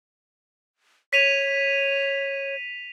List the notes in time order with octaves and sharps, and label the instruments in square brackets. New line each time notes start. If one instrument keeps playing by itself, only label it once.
[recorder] C#5 [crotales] B6 D#7 F7